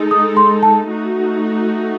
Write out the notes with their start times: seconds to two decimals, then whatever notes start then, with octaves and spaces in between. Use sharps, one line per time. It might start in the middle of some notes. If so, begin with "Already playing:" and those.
Already playing: G#3 D#4 A4
0.11 D#6
0.37 C6
0.63 A5
0.88 A3 D#4 F#4